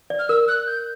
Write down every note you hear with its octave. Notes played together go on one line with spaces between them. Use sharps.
D5
F6
A#4 E6
F#6
G6